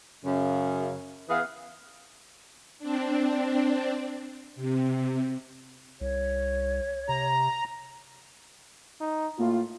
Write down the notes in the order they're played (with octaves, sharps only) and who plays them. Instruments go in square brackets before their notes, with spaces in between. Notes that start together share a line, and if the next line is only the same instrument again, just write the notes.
[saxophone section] F#2 C#3
E3 B3 G#4 F5
[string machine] C4 D4
C3
[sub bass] C2 [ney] C#5
[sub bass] C3 [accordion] A#5
[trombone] D#4
[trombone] A2 [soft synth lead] A#3 [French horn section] F4